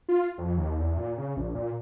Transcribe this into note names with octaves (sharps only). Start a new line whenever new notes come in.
F4
F2
D#2
E2
A#2
C#3
A#1
A#2